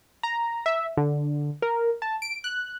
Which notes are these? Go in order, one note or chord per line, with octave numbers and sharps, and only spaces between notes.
A#5
E5
D3
A#4
A5
D7
F#6